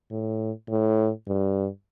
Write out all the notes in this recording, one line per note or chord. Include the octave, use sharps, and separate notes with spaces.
A2
A2
G2